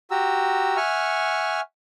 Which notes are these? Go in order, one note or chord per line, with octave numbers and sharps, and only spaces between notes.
F#4 G4 A#5 E6
E5 F#5 G#5 C#6 F6